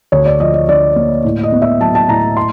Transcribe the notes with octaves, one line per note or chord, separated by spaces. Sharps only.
D2 C#5
D5
F3 D#5
D#5
D3 D5
A#3
A2
D#5
B3
E5
F#3 A5
A5
A2 A#5
C6